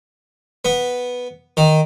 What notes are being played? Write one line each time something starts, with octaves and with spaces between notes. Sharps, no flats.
B3
D#3